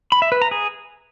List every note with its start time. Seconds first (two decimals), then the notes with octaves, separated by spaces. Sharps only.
0.12 B5
0.22 E5
0.32 B4
0.42 A#5
0.51 G#4